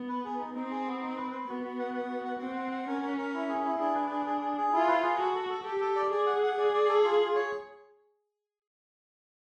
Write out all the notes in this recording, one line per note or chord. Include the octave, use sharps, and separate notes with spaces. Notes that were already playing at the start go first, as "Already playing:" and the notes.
Already playing: B3
B4
G#4
D#4
C4 D#4
G#4
B3
D#4
B4
B4
B3 F#4
F#4
F#5
F#5
F#4
F#5
C4 F#5
F#5
F#5
C#4 A#4
A#4
A#4
E4
G#4
E4
D4 G#4
B4
G#4
G#4
G#4
G#4
E4 F4
B4
G#4
F#4 A4
A4
A4
G4 A4
A4
D5
G#4 D5
F#5
F#5
G#4 D5
D5
A4
F4
F4
C#5